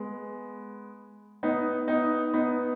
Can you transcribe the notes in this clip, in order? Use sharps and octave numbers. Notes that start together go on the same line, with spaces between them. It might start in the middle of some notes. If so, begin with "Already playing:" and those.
Already playing: G#3 B3
B3 D#4
B3 D#4
B3 D#4